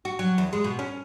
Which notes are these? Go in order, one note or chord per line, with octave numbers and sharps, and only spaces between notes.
F#4
F#3
E2
G#3
B2
C#4